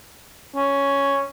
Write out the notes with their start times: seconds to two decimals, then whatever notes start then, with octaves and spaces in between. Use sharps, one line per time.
0.56 C#4